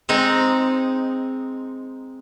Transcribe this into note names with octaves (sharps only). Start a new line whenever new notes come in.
G#3 C4 D#4